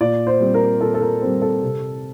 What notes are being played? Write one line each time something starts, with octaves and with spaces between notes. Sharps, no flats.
A#2 D5
C5
G3 C4
A#4
A#2 A4
A4
A#4
G3 C4
A4
C3